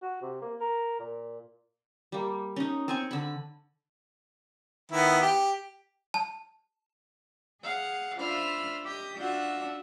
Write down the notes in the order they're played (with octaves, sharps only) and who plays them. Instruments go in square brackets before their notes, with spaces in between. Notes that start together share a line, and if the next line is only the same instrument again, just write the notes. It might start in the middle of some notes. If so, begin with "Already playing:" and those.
[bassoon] F#4
C3
A#3
A#4
A#2
[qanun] G3 A#3
C#4 D#4
C4 G#5 C#6
D3 B5
[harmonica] D#3 B3 E4
G4
[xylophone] A5
[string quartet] G#4 F5 F#5
D4 F4 C5 E5 B5 F6
G4 D#5 G6
D4 F4 F#4 E5 F#5